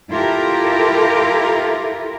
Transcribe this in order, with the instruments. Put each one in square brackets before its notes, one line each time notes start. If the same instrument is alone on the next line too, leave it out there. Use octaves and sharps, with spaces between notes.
[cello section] E4 F4 G4 A4 A#4